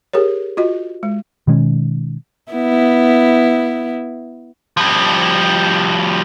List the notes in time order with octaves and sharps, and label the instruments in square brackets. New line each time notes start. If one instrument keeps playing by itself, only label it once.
[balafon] G4 G#4 A#4 C#5
F4 F#4 D#5
G#3
[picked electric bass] B2 D#3 G#3 C#4
[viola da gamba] B3 E4
[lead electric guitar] F3 G3